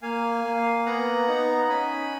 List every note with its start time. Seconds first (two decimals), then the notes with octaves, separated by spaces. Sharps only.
0.02 A#3 F5 G#5
0.44 A#3
0.86 B3 F#5 A#5
1.28 D#4
1.69 C#4 G#5 B5